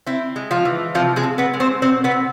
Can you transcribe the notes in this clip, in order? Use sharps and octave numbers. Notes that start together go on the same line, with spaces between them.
C4 E4
G#3
F3 F4
E3
C3 F3 F4
G#3 G#4
C4
B3 B4
G#3
C4 C5
B2 C4 C5
B3 B4
C4